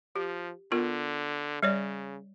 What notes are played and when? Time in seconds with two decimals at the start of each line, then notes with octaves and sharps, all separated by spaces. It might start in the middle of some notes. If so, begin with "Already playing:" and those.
0.16 F3 G4
0.72 D3 B3 F4 A#4
1.63 C#3 G3 C#5 D5